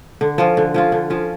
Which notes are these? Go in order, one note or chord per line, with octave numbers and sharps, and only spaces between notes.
D3
F3 C#4 F4
D3
F3 C#4 F4
D3
F3 C#4 F4